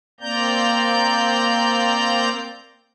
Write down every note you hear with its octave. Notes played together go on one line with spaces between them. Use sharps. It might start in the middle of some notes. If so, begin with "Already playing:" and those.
A#3 C4 D5 A#5 G6